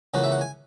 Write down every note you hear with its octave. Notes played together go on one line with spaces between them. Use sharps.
C#2 C#3 E3 A#3 C#4 F#4
E5
F#5
G#5